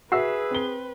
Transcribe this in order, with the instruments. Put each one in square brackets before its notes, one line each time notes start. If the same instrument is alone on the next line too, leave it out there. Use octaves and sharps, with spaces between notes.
[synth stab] F#4 [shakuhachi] G#4 [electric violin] B4 [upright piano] E5 E6 C7
[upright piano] C4 G7